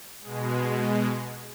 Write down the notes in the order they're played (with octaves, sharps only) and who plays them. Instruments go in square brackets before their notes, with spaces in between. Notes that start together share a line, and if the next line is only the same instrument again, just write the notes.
[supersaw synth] B2 G#3